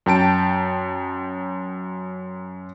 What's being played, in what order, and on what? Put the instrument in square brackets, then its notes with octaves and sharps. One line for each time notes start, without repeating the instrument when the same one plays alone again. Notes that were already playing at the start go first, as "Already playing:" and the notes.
[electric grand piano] F#2 G5 A5 D7